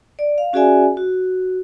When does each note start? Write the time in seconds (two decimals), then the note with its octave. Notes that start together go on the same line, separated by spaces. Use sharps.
0.19 D5
0.38 F5
0.53 C#4 F#4 G#4 D5 E5 G#5
0.97 F#4